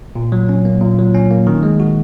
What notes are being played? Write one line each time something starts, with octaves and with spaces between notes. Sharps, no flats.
A#2
F#3
C#4
A#3
A#2
F#3
C#4
A#3
D#3
G#3
F#4